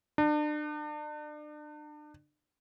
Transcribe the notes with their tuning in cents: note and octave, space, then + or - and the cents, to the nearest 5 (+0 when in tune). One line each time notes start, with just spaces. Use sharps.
D4 +35